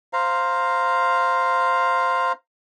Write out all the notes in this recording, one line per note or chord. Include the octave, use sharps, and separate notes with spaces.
C5 F5 A#5